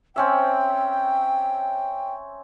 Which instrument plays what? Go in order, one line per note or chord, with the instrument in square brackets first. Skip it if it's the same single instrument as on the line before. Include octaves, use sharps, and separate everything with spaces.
[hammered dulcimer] C4 C#4 E5 [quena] G5